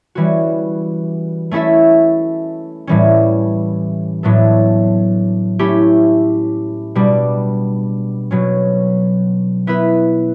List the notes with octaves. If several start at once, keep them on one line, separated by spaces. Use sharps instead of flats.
E3 G3 C#4 F#4
A3 C#4 E4 A4 E5
A2 E3 G3 C#4
A2 F#3 B3 D4 A4
A3 C#4 E4 G4
B2 G3 D4
B2 F#3 C#4
B3 E4 B4